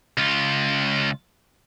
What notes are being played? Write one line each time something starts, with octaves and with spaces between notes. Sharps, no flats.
C#2 F4